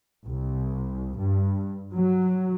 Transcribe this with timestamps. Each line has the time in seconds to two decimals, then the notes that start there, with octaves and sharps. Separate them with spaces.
0.26 C2
1.18 G2
1.92 F#3